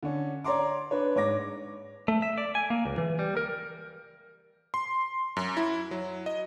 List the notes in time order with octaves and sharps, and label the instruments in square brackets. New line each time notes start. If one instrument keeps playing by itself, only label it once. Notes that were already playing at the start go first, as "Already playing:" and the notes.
[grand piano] D3 C#4
C#5 D5 A#5 C6 D6
D4 B4 C#5
G#2 C#5 D6 A#6
[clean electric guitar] A3
E5
D5
G#5
A#3
C#2
E3
G3
A#4
[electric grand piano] C6
F#2
E4
F#3
D#5